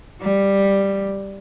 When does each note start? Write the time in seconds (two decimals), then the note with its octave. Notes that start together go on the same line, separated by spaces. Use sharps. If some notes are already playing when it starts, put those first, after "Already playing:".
0.21 G3